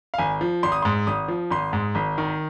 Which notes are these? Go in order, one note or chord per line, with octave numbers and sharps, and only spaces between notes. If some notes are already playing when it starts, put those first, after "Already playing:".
F5
G#1 G#5
F3
G#1 C6
D#6
C6
G#2
G#1 D#6
F3
G#1 C6
G#2
G#1
D#3